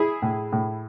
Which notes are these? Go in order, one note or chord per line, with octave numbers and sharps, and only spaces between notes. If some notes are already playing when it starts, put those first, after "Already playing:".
Already playing: E4 G#4
A2
A2